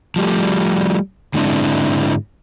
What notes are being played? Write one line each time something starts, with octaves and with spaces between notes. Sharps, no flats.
F3 G3 A3
G#2 D3 G#3 C4 D4 E4